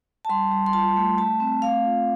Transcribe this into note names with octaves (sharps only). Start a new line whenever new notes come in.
A5
G3 C6
G3
C6
F4 A5
A3
A3 A5
C4
A3 F5
F4